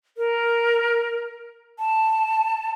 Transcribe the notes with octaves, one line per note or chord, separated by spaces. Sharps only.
A#4
A5